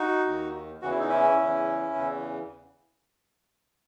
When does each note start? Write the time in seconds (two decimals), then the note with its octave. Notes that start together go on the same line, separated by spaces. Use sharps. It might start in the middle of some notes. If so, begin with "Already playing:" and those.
Already playing: D#4 F#4
0.26 D#2 D#3
0.82 E2 C#3 E3 F#4
0.91 E4
1.00 D#4
1.09 C#4 E4
1.37 E2 C#3 E3
1.94 E2 C#3 E3